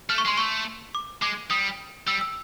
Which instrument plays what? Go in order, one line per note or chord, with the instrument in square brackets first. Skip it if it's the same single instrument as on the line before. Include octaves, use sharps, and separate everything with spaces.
[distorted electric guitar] A3 [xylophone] F6
[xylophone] C#6
[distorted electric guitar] G#3 [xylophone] C6
[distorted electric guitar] A3 [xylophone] C#6
[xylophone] D6
[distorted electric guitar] G#3 [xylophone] D6
[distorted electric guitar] G3 [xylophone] D#6
[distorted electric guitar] G3 [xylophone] E6
[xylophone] E6